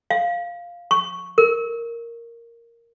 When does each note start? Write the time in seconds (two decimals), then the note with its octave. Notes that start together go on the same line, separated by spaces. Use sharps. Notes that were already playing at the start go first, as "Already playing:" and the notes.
0.11 F5
0.91 C#6
1.38 A#4